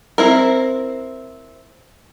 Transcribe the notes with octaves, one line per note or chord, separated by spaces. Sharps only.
C4 E4 A#4